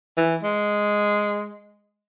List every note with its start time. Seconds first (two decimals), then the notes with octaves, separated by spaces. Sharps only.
0.17 E3
0.43 G#3